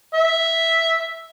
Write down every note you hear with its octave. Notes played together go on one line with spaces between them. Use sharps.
E5